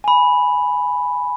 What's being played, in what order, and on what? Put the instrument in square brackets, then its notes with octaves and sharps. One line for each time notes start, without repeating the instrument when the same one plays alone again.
[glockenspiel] G#5 B5